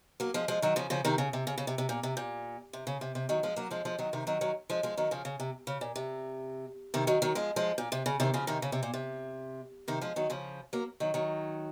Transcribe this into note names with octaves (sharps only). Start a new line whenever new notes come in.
F#3 A#3
F3 G#3
F3 G#3
D#3 F#3
C#3 F3
C#3 F3
C3 D#3
C#3
C3
C#3
C#3
C3
C3
A#2
C3
A#2
C3
C#3
C3
C3
D#3 F#3
F3 G#3
F#3 A#3
F3 G#3
F3 G#3
D#3 F#3
C3 D#3
D#3 F#3
D#3 F#3
F3 G#3
F3 G#3
D#3 F#3
C#3 F3
C#3
C3
C#3
A#2
C3
C3 D#3
D#3 F#3
D#3 F#3
F3 G#3
F3 G#3
A#2
C3
C#3
C3 D#3
C#3 F3
C3 D#3
C#3
C3
A#2
C3
C3 D#3
F3 G#3
D#3 F#3
C#3 F3
F#3 A#3
D#3 F#3
D#3 F#3